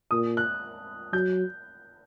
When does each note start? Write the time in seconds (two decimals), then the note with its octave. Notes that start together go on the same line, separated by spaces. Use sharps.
0.11 A#2 D#6
0.37 F#6
1.13 F#3 G6